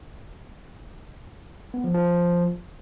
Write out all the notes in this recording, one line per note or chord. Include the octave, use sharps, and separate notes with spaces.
B3
F3
F3